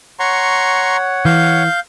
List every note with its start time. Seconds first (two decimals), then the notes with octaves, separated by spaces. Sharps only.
0.19 C#5 F#5 A#5 C6 C#6
1.25 E3 F5 G6